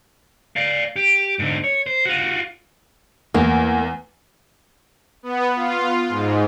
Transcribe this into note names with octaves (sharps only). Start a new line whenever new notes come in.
D5 F5
G4
G#2 D3
C#5
C5
F4 F#4
E2 A#3
B3
F4
G#2